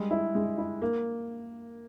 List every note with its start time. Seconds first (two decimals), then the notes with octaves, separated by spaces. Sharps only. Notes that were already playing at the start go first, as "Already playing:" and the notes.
Already playing: G3 G#3
0.11 E4
0.35 G#3
0.58 E4
0.82 A#3